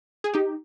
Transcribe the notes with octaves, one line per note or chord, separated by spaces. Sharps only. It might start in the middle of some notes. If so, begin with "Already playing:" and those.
G#4
D#4 G4